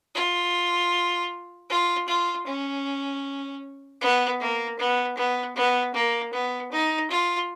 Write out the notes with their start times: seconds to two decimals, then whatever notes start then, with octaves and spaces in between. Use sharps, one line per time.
0.15 F4
1.70 F4
2.08 F4
2.47 C#4
4.01 B3
4.40 A#3
4.79 B3
5.17 B3
5.56 B3
5.94 A#3
6.33 B3
6.72 D#4
7.10 F4